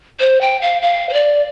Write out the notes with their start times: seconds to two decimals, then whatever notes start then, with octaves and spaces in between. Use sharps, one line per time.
0.20 C5
0.41 G5
0.62 F5
0.82 F5
1.09 C5
1.13 D5